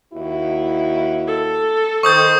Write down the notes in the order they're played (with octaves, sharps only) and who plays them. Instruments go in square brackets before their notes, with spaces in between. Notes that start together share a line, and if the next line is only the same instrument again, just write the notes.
[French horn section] D#2 E4 F#4
[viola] A4
[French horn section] D#3 C5 [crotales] C#6 D#6 G6